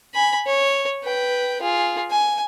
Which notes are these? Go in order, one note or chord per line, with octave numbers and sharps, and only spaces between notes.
G#5 B5
C#5
B4 G5
F4 G#4
G#5